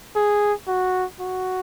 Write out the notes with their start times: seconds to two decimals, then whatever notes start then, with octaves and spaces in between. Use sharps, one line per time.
0.16 G#4
0.68 F#4
1.20 F#4